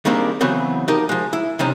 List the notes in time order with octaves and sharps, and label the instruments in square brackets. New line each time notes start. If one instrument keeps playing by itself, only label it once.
[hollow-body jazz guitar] D#3 G3 G#3 A#3 C4 D4
C#3 E3 F#3 B3 C4
F3 D#4 G4 A#4 D#5
F3 G#3
E4
C3 F3 G3 C#4 D#4